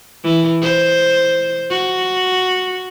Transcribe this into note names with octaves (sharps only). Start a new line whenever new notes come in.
E3
C5
F#4